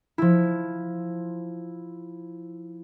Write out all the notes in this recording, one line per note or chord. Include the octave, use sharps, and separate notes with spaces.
F3 E4